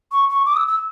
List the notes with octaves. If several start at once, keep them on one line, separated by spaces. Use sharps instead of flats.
C#6
C#6
D6
D#6
E6
E6